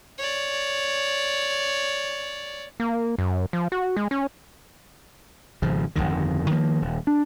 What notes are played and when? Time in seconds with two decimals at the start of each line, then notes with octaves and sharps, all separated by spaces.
0.19 C#5 D5
2.80 A#3
3.18 F#2
3.53 F3
3.72 F#4
3.96 G#3
4.11 C#4
5.62 G#1 C#3 F3
5.96 G1 C2 F2 D#3
6.50 D#3 F3 A#3
6.82 D#1
7.07 D4